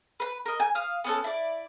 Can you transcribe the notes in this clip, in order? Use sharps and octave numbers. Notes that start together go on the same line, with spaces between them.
B4 B5
A#4 D#5
G#5
F5 D#6
B3 C#4 A4
E4 D5